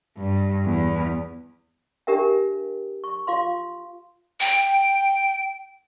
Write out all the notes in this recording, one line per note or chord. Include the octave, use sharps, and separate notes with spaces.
G2
E2
D4 G4 A#4 E5 G5
C#6
F4 F5 C6
G5